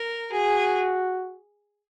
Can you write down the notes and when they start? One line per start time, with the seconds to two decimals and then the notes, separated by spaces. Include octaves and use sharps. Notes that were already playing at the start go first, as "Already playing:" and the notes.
Already playing: A#4
0.32 F#4 G#4